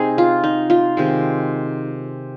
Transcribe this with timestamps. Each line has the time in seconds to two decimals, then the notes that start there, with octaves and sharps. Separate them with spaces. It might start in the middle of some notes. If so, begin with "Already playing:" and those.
Already playing: C3 C4 D#4 G#4
0.18 F4
0.44 D#4
0.70 F4
0.97 C3 D#3 G#3